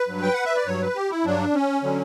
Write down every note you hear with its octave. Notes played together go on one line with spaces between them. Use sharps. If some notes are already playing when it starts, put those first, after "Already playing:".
Already playing: B4
G2 F#3
G5
F#5
E5
D5
G2 F#3 C#5
B4
G4
E4
G2 F#3 D4
C#4
D3 F#3